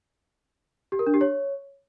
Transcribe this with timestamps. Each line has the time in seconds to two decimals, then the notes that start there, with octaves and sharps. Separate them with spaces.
0.92 G4
0.99 A#4
1.06 D4
1.14 G4
1.21 C#5